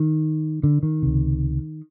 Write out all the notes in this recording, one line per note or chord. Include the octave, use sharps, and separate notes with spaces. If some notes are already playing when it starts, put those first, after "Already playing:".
Already playing: D#3
D3
D#3
C#2 C3